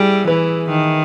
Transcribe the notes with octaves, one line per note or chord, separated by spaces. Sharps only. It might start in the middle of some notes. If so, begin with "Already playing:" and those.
Already playing: G3 E4 G#4
E3 B4
D#3